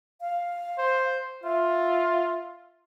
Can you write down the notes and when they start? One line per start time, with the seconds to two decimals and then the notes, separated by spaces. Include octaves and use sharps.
0.21 F5
0.78 C5
1.44 F4 E5